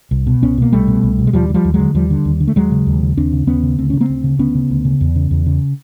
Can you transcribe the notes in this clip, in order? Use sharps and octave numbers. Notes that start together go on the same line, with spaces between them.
C2
B2
C2 B3 C#4
B2 A#3
C2 G3 A3
B2
C2
B2
G#3
D#2 F3 G3
D3
F3 G3
D#2
F#3 G#3
D3
D#2 F3 G3
D3
D#2
D3
A3
D#2 F#3 G#3
C#3
D#2
C#3
D#2 C4 D4
C#3
D#2 B3 C#4
C#3
D2 C4
C#3 C#4
A#3 C4
D2
C#3
D2 B3 C#4
C#3
D2
C#3
E2
C#3
E2
C#3